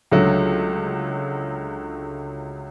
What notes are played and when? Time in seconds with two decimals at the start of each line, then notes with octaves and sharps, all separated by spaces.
0.11 C#2 D3 F#3 A3